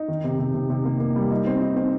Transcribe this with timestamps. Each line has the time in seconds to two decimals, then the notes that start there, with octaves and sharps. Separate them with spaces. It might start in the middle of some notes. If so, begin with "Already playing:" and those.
Already playing: D#4
0.08 D#3
0.24 C3
0.39 C3
0.54 C3
0.70 C3
0.85 A#3
1.00 A#3
1.16 G3
1.31 D#4
1.47 C4
1.62 D#4
1.76 C4